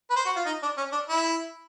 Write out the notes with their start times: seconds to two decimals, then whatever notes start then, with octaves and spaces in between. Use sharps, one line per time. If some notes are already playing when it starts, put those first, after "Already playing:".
0.10 B4
0.16 C5
0.26 F#4
0.36 F4
0.46 D#4
0.62 D4
0.78 C#4
0.92 D4
1.08 E4